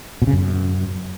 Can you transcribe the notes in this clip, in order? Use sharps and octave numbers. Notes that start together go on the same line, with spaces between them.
B2
C#3
F#2